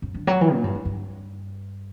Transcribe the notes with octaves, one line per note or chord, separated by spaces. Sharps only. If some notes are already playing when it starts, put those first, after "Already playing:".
F#2
D3
F#3
E3
A#2
G2
F#2
G2